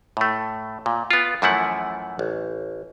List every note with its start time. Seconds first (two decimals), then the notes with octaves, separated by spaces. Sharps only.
0.17 A2 A3
0.86 A#2
1.11 B3 F4
1.42 F#2 E3 F3 A3 E4 F#5
2.19 A1